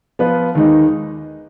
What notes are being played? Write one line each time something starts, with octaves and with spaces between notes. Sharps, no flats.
F3 B3 F4 B4
D#2 D#3 G#3 D#4